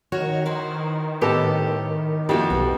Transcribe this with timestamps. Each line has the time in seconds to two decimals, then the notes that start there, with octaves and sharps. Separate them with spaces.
0.12 D#3 F#4 A#4 C#5
0.45 E4 B4 C5
1.21 A2 B3 G4 A4 D#5
2.29 F2 A#3 E4 F#4 G4 A4 G5
2.50 B1 B2